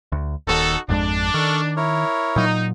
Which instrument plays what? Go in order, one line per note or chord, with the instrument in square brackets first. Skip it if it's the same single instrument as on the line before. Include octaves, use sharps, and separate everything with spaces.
[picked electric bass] D2
[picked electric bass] D#1 D#2 [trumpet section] D#4 F#4 A4
[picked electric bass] G#1 F2 G#3 [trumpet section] D4
[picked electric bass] D#3 [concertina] A4 C#6 F6
[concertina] E4 A#4 C#5
[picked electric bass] A#2 F#3 [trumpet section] D#4